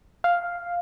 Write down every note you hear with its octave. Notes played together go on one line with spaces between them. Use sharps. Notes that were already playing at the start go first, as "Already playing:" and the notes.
F5